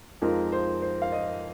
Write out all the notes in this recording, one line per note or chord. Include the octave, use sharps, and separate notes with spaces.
F2 F3 G#3 D#4 A#4
C5
C5
F5
D#5